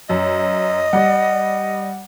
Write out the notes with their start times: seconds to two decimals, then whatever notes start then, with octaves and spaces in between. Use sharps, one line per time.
0.09 F#2 D#5
0.93 G3 D5 F#5